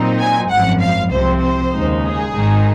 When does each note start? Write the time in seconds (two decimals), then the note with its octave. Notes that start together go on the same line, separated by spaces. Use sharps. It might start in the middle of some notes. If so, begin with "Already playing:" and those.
Already playing: A#2 F#3 C4 D#4
0.19 G#5
0.50 G#1 F#2 F3 F#5
0.80 F5
1.10 C2 C3 F3 C4 C5
1.41 C5
1.72 D#2 C#3 G#3 D#4
2.02 G#4
2.32 G#1 G#2 D#3 G#3 D#4